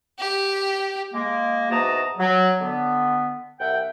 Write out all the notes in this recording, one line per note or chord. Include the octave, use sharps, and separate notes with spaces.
G4
G#3 A#3
E2 G#2 F#4 A5 A#5 D#6
F#3
D3 B3
C2 E5 F#5 G5